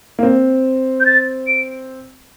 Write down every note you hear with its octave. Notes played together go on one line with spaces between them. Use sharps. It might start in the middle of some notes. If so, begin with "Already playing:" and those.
A#3
C4
G6
A6
D7